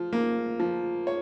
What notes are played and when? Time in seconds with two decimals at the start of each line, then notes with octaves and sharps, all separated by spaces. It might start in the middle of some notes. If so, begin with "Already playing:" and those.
Already playing: F3
0.13 A#3
0.60 F3
1.07 C#5